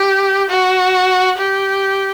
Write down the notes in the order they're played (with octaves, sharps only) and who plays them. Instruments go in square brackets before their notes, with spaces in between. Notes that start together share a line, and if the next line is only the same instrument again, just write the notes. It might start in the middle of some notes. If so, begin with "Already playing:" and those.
Already playing: [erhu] G4
F#4
G4